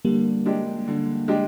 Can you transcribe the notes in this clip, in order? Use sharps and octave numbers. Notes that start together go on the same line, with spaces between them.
D3 G3 A#3
G#3 D4 G4
D3
G#3 D4 G4